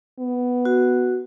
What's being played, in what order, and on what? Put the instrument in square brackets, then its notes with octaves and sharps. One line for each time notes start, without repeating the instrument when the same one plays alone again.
[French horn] B3
[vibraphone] F#4